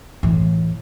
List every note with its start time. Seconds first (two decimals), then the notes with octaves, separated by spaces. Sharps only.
0.23 A2 E3